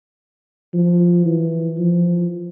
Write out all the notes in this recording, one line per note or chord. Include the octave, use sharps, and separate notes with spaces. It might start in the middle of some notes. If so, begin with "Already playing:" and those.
F3
E3
F3